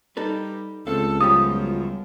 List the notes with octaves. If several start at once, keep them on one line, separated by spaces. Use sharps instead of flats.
G3 D#4 A4 B4
C#2 A3 C4 A4 F5
F#2 F3 G3 B3 G4 D#6